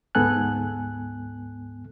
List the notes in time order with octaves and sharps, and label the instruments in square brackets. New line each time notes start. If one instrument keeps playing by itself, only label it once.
[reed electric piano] D2 G#2 B3 A4 G#5 F#6